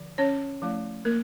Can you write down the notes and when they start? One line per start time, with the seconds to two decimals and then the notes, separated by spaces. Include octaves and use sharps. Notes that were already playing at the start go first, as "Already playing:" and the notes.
Already playing: D3 F3
0.18 C#4 C#5
0.62 F3 A3 C#4 E4
1.05 A#3 A#4